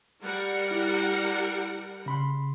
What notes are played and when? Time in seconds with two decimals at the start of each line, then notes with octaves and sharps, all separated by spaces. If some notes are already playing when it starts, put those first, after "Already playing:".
0.22 G3 A#4 F#5
0.71 E4
2.06 C#3 B5 C6